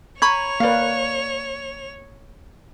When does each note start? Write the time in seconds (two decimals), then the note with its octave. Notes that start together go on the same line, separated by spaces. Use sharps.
0.22 C#5 A#5 B5 C#6 G#6 F7
0.60 A#3 B4 D5 F5